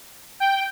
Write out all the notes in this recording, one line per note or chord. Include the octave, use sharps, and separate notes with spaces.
G5